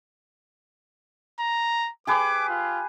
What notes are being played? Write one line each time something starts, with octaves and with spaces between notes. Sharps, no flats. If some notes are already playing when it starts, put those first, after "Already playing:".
A#5
G4 G#4 B4 D6
F4